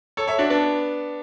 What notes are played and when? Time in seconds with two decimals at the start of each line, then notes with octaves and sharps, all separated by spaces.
0.17 A4 C#5
0.28 C#5 E5
0.38 D4 F#4
0.50 B3 D4